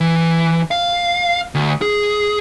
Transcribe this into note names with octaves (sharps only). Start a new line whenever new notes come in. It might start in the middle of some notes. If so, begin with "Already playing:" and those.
E3
F5
D2
G#4